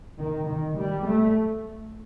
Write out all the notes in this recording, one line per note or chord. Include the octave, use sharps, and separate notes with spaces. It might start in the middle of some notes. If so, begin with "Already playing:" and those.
D#3
D#3
G3
A3